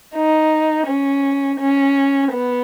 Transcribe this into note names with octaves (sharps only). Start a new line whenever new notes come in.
D#4
C#4
C#4
B3